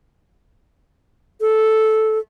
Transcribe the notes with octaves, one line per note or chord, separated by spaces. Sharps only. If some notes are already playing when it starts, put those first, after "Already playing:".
A4